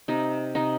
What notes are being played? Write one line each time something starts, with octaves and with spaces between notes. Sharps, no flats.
C3 D#4
C3 D#4